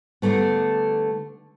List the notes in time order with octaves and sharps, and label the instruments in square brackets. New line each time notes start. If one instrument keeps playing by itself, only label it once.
[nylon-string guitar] D3 G3 A3 B3